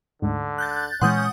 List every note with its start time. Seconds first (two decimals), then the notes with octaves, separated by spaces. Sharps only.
0.22 D2 G#2 D3
0.58 F#6 G6 A6
1.01 A#2 E3 G#3 C#4 F#5 C6 D#6 G6